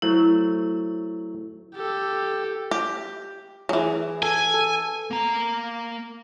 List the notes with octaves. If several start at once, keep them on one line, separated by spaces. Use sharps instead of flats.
F#3 A3 E4 C5
G4 A4
G4
E3 F#3 G#4
A4 G#5
A4
A#3 A#5